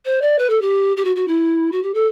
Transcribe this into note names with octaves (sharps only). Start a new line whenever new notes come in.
C5
D5
B4
A4
G4
G4
F#4
F#4
E4
F#4
G4
A4